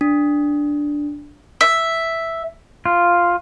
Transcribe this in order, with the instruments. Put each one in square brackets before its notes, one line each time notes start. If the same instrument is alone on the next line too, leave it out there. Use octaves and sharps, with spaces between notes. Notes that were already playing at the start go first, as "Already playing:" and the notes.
[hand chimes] D4
[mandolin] E5
[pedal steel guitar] F4